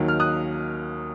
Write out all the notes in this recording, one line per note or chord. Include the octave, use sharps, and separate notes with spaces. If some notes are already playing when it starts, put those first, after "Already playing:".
Already playing: D#2 D#3 F#3
F6
D#6 F#6